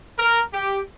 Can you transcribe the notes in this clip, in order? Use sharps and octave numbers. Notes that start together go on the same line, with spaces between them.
A#4
G4